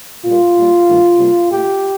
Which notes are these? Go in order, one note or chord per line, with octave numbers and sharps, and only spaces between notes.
A#2 G3 A#3 F4
A#2 G3 A#3
G2 D#3 A3
C3 G3 A#3
A#2 A3 G4